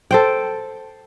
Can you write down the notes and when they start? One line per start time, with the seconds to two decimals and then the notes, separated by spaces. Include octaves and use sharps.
0.11 A4 C5 G5